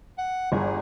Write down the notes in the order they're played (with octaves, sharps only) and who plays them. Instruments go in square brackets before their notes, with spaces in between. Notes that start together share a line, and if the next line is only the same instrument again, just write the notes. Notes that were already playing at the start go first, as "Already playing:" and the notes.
[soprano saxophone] F#5
[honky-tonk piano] G1 [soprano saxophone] G#4